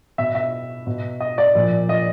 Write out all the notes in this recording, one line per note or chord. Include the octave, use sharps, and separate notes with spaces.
B2 E5
E5
B2
D#5
D5
A#2 F3
D#5